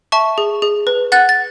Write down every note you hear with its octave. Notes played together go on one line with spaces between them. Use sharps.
E5 A5 C#6
G#4
G#4
B4
F#5 F#6 A6
A6